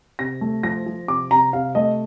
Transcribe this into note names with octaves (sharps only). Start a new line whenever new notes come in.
C3 A#6
A3
F3 A#6
F3
C3 D6
C3 A#5
C3 F5
A3 D#5